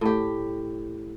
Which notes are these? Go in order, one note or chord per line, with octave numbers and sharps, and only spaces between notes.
A2 G4